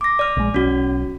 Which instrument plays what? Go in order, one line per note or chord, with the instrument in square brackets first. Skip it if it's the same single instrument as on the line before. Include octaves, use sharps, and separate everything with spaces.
[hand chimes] D6 A#6
D5 F6
[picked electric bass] A#1 G#3
[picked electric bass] B1 [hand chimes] C#4 F#4